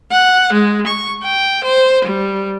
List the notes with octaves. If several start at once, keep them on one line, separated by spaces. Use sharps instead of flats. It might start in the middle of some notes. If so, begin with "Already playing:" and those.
F#5
G#3
C#6
G5
C5
G3